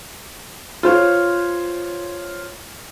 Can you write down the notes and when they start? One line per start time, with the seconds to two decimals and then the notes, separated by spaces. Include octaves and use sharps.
0.83 F4 C5 C#5